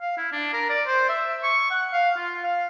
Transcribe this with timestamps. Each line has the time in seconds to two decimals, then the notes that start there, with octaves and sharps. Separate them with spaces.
0.01 F5
0.17 E4
0.32 D4
0.53 A#4
0.69 D5
0.87 C5
1.09 E5
1.43 C#6
1.71 F#5
1.93 F5
2.17 F4
2.43 F5